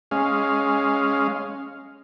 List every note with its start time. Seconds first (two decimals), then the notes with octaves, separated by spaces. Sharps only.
0.11 G#3 C#4 F5